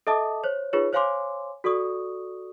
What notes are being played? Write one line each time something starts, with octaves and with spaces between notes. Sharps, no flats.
A4 D#5 E5 A5 D6 D#6
C5 C#5
D#4 F4 G#4 B4 C#5
C5 C#5 F5 G#5 C6 D6
F#4 A4 D5 C#6 D#6